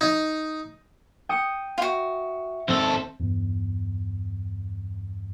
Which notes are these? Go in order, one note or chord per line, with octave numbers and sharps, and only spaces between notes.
D#4
G5 D#6 C#7
F4 F#4 E5
D#2 C4 A4
E2 G2